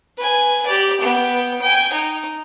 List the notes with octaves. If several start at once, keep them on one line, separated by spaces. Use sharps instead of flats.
B4 G#5
G4 D5
B3 G5
G5 G#5
D#4